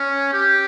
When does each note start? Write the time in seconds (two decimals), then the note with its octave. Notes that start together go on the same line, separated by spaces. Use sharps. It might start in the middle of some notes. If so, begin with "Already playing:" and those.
Already playing: C#4
0.33 G4